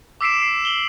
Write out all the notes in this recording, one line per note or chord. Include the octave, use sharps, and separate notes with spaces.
D6 E6 B6 C7 D7 E7
C7
E7 F#7 G7